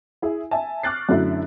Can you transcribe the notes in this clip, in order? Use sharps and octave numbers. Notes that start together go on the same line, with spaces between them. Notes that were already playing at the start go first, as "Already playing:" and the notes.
E4 G#4
E5 G#5 A5
C#6 D6 F6 F#6 A6 C7
F#2 D3 F#3 A3 E4